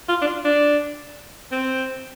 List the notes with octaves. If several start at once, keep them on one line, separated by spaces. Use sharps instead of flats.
F4
D4
F4
D4
C4